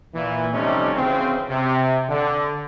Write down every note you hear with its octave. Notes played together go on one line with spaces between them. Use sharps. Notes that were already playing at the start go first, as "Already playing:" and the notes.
A#2 E3
F2 C3 G3 A3 C#4 D#4
D2 C#3 E3 C4
C3
D3